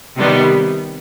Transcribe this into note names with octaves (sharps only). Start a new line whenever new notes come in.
C3 D#3 G3 B3